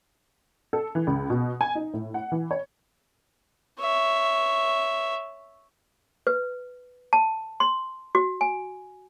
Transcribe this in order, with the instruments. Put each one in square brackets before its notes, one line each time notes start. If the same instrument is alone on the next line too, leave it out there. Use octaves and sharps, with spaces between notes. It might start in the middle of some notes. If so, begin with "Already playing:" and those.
[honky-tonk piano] A4
E3
C#2
B2
G#5
D#4
A2
F#5
E3
C#5
[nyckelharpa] C#5 E5
[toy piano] B4
A5
C6
F#4
G#5